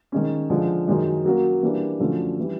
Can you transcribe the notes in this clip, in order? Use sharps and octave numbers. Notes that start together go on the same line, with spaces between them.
D#3 G#3 C#4
D3 F3 G#3
F#2 D#3 G#3
F#3 A#3 C#4 F#4 A#4
E3 G3 A#3 D4
F#2 D3 F3 A3 C#4
E3 G3